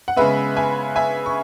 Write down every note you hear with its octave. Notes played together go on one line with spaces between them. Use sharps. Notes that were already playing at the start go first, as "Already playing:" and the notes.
F#5
C#3 G#3 B3 B4 E5
E5 G#5
E5 G#5
C#6